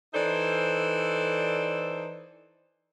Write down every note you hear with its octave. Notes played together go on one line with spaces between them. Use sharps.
E3 D#4 A4 C5 D5